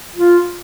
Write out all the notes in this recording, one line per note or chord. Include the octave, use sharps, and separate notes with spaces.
F4